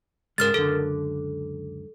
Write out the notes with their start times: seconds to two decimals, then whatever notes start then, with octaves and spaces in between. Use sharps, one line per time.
0.38 G#2 C#3 G#3 A#4 F6 A6
0.54 C#2 F#2 D3 A4